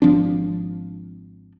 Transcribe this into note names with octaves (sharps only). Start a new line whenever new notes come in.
G#1 F3 C4 D4